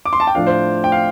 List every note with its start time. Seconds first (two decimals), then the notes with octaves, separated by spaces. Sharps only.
0.05 D6
0.13 C6
0.20 A5
0.27 G5
0.35 A2 F3 D4 F5
0.47 C5
0.84 G5
0.92 F5